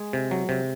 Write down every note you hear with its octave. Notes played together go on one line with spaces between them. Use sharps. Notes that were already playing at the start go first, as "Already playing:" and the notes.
Already playing: G#3 G#4
C3
F#3
C3